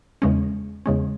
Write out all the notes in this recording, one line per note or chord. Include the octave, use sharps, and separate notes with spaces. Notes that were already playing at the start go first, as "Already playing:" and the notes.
E2 C#3 G#3 C#4
E2 C#3 G#3 C#4